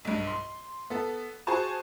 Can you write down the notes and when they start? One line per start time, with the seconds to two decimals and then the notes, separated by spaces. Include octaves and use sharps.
0.05 B1 G2
0.27 C6
0.90 B3 A4
1.47 F#4 G#4 C5 G#5 A5 C#6